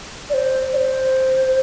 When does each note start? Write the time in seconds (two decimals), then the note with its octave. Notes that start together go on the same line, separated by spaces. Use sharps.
0.30 D5
0.34 C5
0.73 D5
0.77 C5